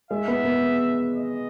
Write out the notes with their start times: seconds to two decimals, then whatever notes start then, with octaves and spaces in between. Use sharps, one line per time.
0.11 G#3 E5
0.28 B3
0.45 B3
1.15 D#5